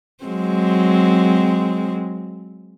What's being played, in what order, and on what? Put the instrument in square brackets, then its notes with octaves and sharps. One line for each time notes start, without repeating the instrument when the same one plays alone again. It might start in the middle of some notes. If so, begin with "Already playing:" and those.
[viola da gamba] F#3 G#3 C4